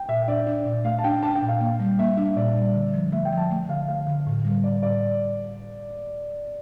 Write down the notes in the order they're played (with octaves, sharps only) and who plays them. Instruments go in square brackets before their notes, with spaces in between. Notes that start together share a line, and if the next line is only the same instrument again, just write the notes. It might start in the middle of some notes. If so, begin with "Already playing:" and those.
Already playing: [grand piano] G5
[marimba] A#2 [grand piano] E5
[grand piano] E5
[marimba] D4 [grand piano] D5
[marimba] D4
A#2
[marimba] A3 [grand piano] F5
[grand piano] A5
[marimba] D4 [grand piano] G5
[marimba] D4 [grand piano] A5
[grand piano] G5
[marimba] A#2
[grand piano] F5
[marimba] A#3
G3
[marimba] A#3 [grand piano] E5
[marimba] D4 [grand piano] E5
[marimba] A#2 [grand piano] D5
[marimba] G3
D3
F3
[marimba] A3 [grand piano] E5
[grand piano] G5
[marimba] F3
[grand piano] A5
[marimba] A3
[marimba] D3 [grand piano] F5
[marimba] A3 [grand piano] F5
[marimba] D3
A2
G3
[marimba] A2 [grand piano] D5
[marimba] A2 [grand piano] D5